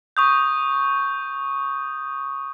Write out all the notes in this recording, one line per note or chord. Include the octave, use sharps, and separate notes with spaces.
C#6 D#6 G6